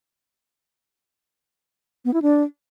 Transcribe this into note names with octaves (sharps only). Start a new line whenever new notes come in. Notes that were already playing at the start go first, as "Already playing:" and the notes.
B3
E4
D4